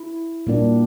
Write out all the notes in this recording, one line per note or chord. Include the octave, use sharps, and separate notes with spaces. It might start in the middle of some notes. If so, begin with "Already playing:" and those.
Already playing: E4
A#2 G3 A#3 D4